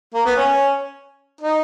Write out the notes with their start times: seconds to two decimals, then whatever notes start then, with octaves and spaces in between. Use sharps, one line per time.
0.14 A#3
0.25 B3
0.36 C#4
1.41 D#4